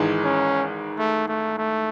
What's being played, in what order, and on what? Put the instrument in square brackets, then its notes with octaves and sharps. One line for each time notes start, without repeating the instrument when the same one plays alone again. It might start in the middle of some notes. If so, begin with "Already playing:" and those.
Already playing: [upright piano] G#1 G#2 E3 G#3
[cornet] C#4
A3
A3
A3